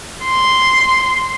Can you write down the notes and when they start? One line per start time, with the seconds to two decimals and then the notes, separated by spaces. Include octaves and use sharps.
0.24 C6